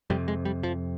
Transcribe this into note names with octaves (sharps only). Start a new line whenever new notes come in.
F2 C3 G3
G#3
G3
F3